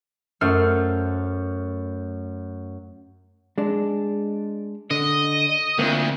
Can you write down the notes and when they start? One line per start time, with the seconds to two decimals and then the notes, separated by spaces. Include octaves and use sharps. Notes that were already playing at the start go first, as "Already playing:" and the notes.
0.41 F#2 A3 C5 F6
3.58 G#3 D4
4.91 D3 D#5
5.79 D2 A#3 C4 F4